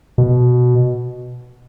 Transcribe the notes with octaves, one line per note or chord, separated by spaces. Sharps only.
B2